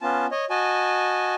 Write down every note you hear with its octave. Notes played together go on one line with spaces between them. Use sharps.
B3 C#4 F4 A5
C#5 D#5
F#4 D#5 G#5 A5